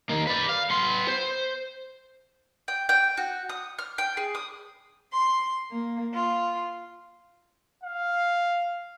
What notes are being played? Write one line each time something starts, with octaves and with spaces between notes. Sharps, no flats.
D#3 A#3
B4 D5
F5
B3 C6
C5
G5
G5
F#4
D#6
F6
G5
G#4
D#6
C6
A#3
F4
F5